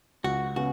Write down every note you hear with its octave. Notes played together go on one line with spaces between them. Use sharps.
C#2 F#4
C#3 B3 F#4